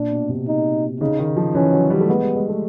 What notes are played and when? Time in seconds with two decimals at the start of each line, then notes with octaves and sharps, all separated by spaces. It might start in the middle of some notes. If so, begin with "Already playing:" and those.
Already playing: A#2 D4
0.11 B2
0.29 C3
0.48 D#4
1.00 C#3 D#4
1.19 D#3
1.37 F3
1.55 E3 C#4
1.73 F#3
1.90 G3
2.00 A3
2.08 G#3 B3
2.22 G3
2.35 G#3
2.49 A3